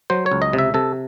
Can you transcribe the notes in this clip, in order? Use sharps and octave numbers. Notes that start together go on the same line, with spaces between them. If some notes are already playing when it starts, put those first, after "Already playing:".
F#3 C5
C#5
C#2
D#5
C3
E5
C3 A4